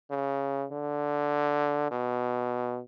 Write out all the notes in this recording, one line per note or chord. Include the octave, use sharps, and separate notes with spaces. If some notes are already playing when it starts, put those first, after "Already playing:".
C#3
D3
B2